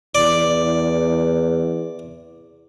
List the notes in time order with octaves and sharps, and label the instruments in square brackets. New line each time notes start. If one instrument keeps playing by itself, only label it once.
[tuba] E2 [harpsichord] D5